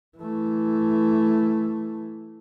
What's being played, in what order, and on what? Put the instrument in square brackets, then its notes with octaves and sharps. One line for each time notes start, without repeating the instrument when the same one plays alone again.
[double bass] E3 A3